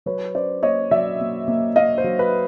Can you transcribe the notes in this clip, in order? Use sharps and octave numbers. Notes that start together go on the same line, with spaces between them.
F#3 B4 C#5
C#4 C5 D5
A#3 C#5 D#5
F#3 D5 E5
A#3
A#3
A#3 D#5 F5
C5
F#3
B4